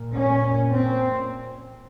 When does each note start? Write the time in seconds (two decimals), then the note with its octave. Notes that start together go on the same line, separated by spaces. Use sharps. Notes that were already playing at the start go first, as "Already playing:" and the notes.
Already playing: A#2
0.15 C#4
0.70 C4